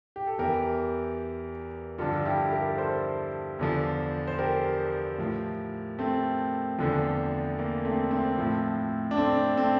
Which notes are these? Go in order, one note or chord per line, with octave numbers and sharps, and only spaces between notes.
G4
A4
E2 E3 G4 A#4
G2 D3 F3 F4 A4
E4 G4
G4 A#4
A4 C5
E2 D3 F3
C5
G4 A#4
A2 F3
A3 C4
E2 D3 F3
A#3
A3 C4
A3 C4
A2 F3
D4
A3 C4
A3 C4